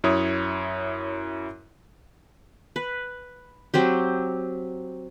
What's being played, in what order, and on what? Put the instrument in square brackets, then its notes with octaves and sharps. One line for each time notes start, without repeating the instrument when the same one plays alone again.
[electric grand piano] F#2 E4 C#5 D#6
[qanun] B4
F#3 C4 G4